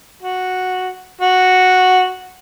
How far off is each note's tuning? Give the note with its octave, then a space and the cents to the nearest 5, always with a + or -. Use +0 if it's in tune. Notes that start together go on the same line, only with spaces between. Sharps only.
F#4 -5
F#4 -5